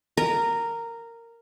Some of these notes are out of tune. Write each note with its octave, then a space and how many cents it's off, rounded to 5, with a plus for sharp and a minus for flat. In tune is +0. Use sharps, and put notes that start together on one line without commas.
A#4 -10